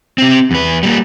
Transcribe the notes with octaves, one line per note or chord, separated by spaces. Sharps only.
C4 G4
E2 B4
G3 A#3